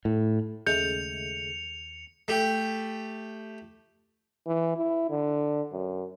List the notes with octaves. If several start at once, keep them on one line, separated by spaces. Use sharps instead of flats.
A2
D#2 C#3 G#3 A3 G6 C#7 F7
A3 G4
E3
E4
D3
F#2